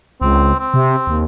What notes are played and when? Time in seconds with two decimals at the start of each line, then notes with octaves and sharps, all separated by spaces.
0.22 C#2 C4
0.59 C4
0.74 C3
1.07 D#2